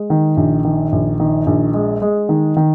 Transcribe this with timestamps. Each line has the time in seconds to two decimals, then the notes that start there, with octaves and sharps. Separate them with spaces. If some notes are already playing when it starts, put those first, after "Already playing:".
Already playing: G#3
0.10 D#3
0.37 A#1
0.65 D#3
0.92 A#1
1.20 D#3
1.47 A#1
1.74 G#3
2.02 G#3
2.29 D#3
2.57 D#3